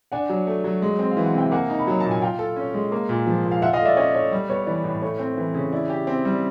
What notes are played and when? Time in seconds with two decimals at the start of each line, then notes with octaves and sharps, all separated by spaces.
0.12 D4 F#5 G#5
0.30 F#3
0.47 A3
0.64 F#3
0.82 G#3
0.99 C4
1.11 F5
1.17 E3
1.25 F#5
1.34 C3 G5
1.51 A#3 F#5 G#5
1.70 D#4
1.79 B5
1.87 F#3 A#5
2.00 A#2 A5
2.11 G#5
2.22 F4 F5 G5
2.39 A4
2.56 C#4
2.74 G#3
2.92 A#3
3.09 A#2
3.27 F3
3.45 A#2
3.51 F5
3.62 F4 E5 F#5
3.73 D#5 F5
3.80 A3
3.85 D5 E5
3.97 C#4 C#5 D#5
4.14 A3 C#5
4.32 G3
4.49 B3 C#5
4.67 E3 D5
4.84 A2
5.02 A3 C#5
5.19 C4
5.37 E3
5.54 C#3
5.72 E4 D5
5.90 G4
6.07 C4
6.25 G3